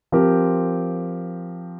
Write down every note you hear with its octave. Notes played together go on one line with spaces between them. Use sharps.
F3 C4 G4 A#4